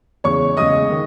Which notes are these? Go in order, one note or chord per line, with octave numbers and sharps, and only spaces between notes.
E2 C#3 G#3 C#5 C#6
E2 C#3 G#3 D#5 D#6
D#3 G#3